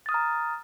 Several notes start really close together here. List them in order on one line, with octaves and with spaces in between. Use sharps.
A6 D#6 F6 A#5